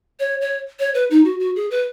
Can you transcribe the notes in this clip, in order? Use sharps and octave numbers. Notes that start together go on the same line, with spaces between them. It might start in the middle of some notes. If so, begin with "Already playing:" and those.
C#5
C#5
C#5
B4
D#4
F#4
F#4
G#4
B4